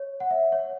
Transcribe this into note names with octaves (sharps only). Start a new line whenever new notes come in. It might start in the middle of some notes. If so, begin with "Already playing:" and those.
Already playing: C#5
F#5
E5
C#5